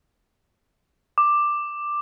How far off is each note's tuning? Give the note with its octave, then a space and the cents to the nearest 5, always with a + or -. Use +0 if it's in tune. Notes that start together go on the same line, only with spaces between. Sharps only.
D6 +10